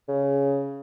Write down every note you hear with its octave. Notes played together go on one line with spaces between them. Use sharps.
C#3